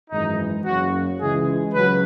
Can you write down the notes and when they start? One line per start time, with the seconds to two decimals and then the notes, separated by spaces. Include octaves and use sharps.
0.10 G#1 F#2 E3 G#3 D#4
0.65 F#1 F#2 C#3 F#4
1.20 C#2 C#3 E3 G#3 G#4
1.74 C#2 C#3 F#3 B4